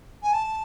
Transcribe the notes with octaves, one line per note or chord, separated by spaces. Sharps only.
G#5
A5